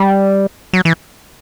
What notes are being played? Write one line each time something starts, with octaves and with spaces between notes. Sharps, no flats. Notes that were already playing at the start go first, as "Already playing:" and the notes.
Already playing: G3
F#3
E3